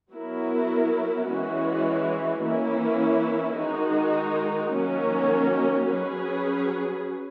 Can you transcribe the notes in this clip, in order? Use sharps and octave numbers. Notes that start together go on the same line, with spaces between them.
F#3 B3 E4 A#4
E3 G#3 C#4 F#4
E3 A#3 C#4 E4
D#3 G#3 D#4 F#4
D#3 F#3 A#3 C#4
F#3 C#4 G#4 B4